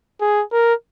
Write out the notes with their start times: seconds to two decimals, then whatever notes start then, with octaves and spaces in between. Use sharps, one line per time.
0.21 G#4
0.52 A#4